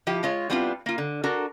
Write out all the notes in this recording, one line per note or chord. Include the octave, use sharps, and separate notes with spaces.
F3 E4 G4
G#3 F4 C#5
G3 B3 C4 D4 E4 F4
A#3 F4
D3
D4 F#4 A4 A#4